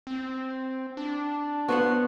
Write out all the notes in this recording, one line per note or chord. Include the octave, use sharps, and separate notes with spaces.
C4
D4
B3 F#4 C5 F#5